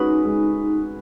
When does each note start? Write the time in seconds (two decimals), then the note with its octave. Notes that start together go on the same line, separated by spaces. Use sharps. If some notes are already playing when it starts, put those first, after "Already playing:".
Already playing: G#3 C#4 D#4 F#4 B4
0.25 G#3